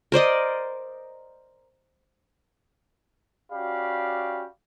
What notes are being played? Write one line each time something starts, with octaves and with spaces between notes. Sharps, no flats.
A#4 C5 D5 D#5
C#4 F#4 G4 D5 F5 B5